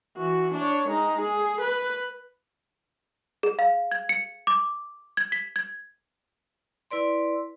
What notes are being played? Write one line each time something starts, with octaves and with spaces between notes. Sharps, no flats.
E3 F#4
D4 C#5
G#3 D#4
G#4
B4
G#4
F5
G#6
C#7
D6
G#6
B6
G#6
E4 B4 D5 C6